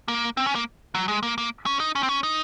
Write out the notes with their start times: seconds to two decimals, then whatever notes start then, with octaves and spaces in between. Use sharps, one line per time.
0.08 A#3
0.37 C4
0.46 C#4
0.55 A#3
0.95 F#3
1.08 G#3
1.23 A#3
1.38 A#3
1.66 C#4
1.80 D#4
1.95 C#4
2.03 C4
2.09 C#4
2.23 D#4